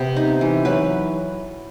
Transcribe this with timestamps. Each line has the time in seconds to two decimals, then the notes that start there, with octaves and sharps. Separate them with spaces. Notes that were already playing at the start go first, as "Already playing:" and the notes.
Already playing: C3 B3
0.16 D#4
0.41 E3
0.65 F#3 B4